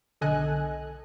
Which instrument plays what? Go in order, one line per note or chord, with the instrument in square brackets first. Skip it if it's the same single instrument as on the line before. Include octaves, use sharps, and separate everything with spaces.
[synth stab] B1 D3 A4 D#5 G#5 F#6